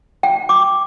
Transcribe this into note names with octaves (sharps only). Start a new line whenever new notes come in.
G5
D6